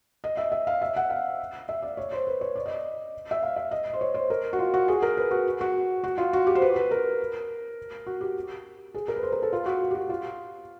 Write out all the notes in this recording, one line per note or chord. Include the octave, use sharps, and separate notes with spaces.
D#5
E5
E5
F5
E5
F#5
F5
E5
D5
C#5
C5
B4
C#5
D5
D#5
E5
F5
E5
D#5
C5
C#5
C5
A#4
F#4
F4
F#4
G#4
A#4
B4
F#4
F#4
F#4
F4
F#4
G4
C5
B4
B4
A#4
F#4
G4
G#4
A#4
B4
C5
A#4
A4
F4
F#4
G4
F#4
F4